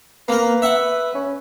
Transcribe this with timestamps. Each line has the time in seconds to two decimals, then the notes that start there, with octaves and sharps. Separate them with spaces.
0.28 A#3 A#4 B4
0.62 E5 F#5
1.15 C#4